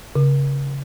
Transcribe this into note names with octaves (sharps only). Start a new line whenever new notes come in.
C#3